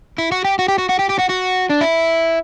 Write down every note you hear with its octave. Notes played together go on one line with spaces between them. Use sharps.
E4
F#4
G4
F#4
G4
F#4
F#4
G4
G4
F#4
F#4
D4
E4